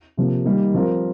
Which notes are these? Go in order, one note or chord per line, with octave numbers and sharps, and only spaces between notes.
C3 F3 A#3
D#3 G3 A#3 D#4
F3 C4 F4 A#4